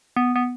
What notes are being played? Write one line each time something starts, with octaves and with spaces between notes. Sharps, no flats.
B3
B3